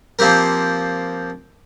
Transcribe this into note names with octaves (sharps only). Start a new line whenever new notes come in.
F3 A#3 C4 G4 A#4